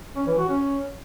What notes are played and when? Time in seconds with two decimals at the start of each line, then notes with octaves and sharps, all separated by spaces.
0.16 C#4
0.27 E3
0.38 F#4
0.49 C#4